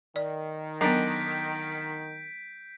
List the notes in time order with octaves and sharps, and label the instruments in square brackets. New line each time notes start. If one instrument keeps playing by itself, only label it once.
[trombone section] D#3 [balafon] D5
[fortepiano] D3 A#4 A#5 [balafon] F#3 B3 [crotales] G6 B6 D7